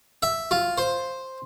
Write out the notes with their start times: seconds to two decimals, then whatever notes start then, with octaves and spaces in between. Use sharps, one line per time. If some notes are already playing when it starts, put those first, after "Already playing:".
0.23 E5
0.51 F4
0.78 C5